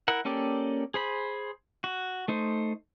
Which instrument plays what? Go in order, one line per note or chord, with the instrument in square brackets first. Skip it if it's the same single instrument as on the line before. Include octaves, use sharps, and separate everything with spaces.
[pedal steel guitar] E4 A#4 F#5
A#3 C#4 G4 A4 D5
G#4 C5 B5
F#4
A3 D#4 C5